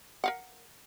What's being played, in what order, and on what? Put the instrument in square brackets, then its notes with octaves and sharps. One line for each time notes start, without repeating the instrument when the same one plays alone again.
[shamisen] A#4 F5 F#5